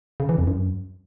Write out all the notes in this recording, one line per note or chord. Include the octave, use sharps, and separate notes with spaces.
C#3
E3
F2
F#2